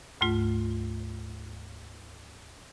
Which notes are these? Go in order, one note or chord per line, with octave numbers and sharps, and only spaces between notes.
D2 G#2 A3 F4